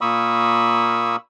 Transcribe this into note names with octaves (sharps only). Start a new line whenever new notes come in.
A#2 A#3 B5 C#6 D#6 E6